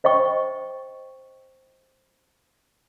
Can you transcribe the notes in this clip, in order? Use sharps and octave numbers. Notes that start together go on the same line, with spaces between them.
C5 D#5 G5 C#6